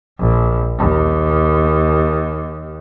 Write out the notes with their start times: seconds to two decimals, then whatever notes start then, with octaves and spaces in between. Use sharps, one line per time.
0.19 A#1
0.78 D#2